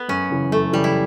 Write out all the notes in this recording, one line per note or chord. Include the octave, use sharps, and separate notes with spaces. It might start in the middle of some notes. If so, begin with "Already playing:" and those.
Already playing: B3
F#2 C#4
C#3 E3
F#2 A3
C#3 E3 G3
E4